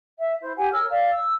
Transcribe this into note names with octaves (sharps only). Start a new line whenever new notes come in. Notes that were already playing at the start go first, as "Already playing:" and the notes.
E5
E4 C5
G4 F#5 G#5
A#4 C#5 E6 F6
D5 F5
E6